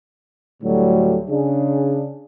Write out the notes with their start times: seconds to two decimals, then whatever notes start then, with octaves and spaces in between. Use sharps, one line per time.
0.62 D2 A2 D3 F#3 G3 A3
1.30 C#3 D4 G#4